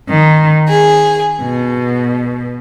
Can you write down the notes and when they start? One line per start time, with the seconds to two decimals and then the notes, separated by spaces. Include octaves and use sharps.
0.10 D#3
0.68 G#4
1.42 B2